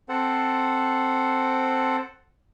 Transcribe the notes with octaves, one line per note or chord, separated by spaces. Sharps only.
C4 A4 C5 F#5